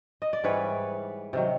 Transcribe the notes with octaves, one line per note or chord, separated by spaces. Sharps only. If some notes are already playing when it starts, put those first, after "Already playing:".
D#5
D5
G#2 E3 G3 B4 C#5
C3 D#3 F#3